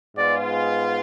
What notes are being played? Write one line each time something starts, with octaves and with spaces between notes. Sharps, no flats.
G#2 G#3 B3 F4 D5